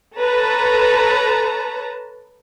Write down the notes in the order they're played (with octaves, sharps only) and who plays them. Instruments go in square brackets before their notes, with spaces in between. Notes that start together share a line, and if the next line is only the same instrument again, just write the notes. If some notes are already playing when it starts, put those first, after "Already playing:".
[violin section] A4 B4 C#5 A5 A#5